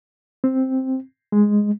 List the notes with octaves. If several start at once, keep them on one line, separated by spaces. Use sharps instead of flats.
C4
G#3